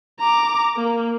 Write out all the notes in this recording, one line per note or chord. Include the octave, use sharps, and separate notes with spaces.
A#5 D6
A#3